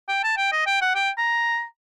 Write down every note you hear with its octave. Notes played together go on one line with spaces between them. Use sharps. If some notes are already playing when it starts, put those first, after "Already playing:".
G5
A5
G5
D#5
G5
F#5
G5
A#5